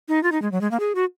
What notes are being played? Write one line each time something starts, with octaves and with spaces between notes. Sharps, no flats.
D#4
F4
D#4
G#3
F#3
G#3
A#3
G#4
F#4